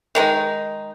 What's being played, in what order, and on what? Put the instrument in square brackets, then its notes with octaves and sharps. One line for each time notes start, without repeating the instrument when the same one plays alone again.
[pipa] D#3 G#3 D#4